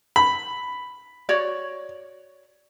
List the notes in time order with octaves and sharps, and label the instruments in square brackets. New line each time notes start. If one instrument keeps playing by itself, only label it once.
[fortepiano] B5
[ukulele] F#4 C#5 D5